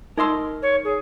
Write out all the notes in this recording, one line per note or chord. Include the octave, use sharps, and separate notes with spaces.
D#4 A#4 D#5 C6 E6
C#5
G#4